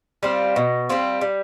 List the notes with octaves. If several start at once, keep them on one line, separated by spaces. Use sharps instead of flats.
G3 C4 F4
B2
G3 C4 F4
G3